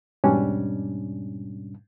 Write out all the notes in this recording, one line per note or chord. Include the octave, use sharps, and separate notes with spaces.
E2 G#2 B2 G3 C#4 D4